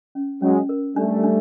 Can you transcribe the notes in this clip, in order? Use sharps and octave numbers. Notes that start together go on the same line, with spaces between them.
C#4
F#3 G#3 C#4
A#4
G3 A3 D4
D4